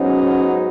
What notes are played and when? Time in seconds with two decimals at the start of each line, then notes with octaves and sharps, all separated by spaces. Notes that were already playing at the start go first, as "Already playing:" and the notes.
Already playing: G#2 F#3 B3 C#4 D#4